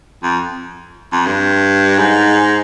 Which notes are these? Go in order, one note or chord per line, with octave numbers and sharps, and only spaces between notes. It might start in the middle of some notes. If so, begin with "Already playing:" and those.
F2
F2
G2
G#2